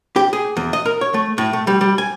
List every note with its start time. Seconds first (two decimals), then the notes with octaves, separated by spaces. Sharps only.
0.16 G4
0.33 G#4
0.57 E2
0.73 D#5
0.86 A#4
1.01 C#5
1.14 A3
1.38 A2
1.53 A3
1.67 G3
1.81 G3
1.98 G#5